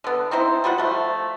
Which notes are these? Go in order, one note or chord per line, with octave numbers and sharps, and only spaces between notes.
D3 B3
C4 D#4 E4 C5
G3 F4 F#4 F#5
F3 A3